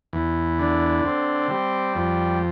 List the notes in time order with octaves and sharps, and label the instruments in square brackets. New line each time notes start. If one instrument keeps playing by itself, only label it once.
[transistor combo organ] E2
D3
C4
G3
F2